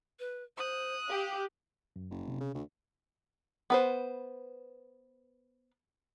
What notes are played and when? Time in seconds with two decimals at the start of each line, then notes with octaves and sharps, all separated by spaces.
0.19 B4
0.57 C5 D#6 F#6
1.09 G4 F5
1.96 F#2
2.10 F#1
2.28 C3
2.41 C#3
2.55 D2
3.70 B3 B4 C5